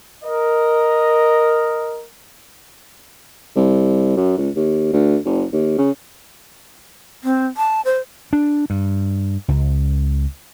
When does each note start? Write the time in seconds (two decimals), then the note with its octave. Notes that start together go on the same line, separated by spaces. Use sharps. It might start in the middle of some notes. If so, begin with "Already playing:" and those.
0.23 A#4 D#5
3.56 C2
4.16 F#2
4.38 C#2
4.56 D#2
4.93 D2
5.25 F#1
5.52 D#2
5.78 C#3
7.24 C4
7.57 A5
7.85 C5
8.33 D4
8.70 G2
9.48 C#2